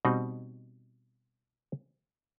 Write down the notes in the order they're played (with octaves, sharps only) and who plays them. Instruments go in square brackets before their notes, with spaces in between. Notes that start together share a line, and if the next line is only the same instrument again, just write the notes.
[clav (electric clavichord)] B2 G3 C4 D#4